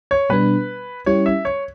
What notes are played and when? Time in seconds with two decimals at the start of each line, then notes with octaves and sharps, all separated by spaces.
0.11 C#5
0.29 B2 G3 B3 D4 B4
1.06 G3 C#4 E4 G4 C#5
1.26 E5
1.45 C#5